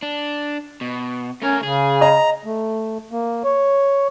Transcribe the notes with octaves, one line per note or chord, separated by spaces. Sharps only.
D4
B2
A3 C#4 A#4
C#3 G#4
D#5 A#5
A3
A#3
C#5